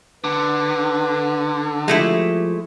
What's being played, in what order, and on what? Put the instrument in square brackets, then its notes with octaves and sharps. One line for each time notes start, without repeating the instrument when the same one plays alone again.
[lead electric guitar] D3 [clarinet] B4
[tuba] F3 [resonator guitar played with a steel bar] G#3 A3 E4 [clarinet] G4